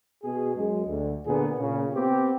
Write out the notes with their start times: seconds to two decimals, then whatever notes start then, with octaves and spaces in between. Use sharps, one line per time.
0.23 B2 G#4
0.56 F#2 G#3
0.87 D2
1.26 A#2 D3 B3 G#4
1.58 A#2 C#3
1.94 B3 C4 G4